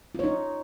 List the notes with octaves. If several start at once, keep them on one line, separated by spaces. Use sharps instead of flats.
D#4 F4 C#5